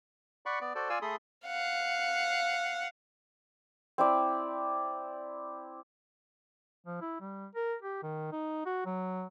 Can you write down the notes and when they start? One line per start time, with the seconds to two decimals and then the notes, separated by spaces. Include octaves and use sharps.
0.46 D5 F#5 B5 C#6
0.61 B3 D5
0.75 F#4 A4 C5 D5
0.90 F4 D5 F5 G#5 E6
1.02 A3 G#4 A4 B5 C6 D#6
1.46 F5 F#5
3.98 C4 E4 D5
6.86 F3
7.01 E4
7.21 G3
7.55 A#4
7.82 G4
8.03 D#3
8.32 D#4
8.66 F#4
8.86 F#3